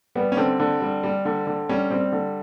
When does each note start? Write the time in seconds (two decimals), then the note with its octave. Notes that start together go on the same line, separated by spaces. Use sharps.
0.15 G3 B3
0.32 C#4
0.37 D3 C4
0.60 D3
0.81 G3
1.03 G3
1.25 D3
1.47 D3
1.69 G3 C#4
1.90 G3 C4
2.12 D3